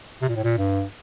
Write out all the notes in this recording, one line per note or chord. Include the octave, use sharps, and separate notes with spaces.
C3
A#2
A2
A#2
G2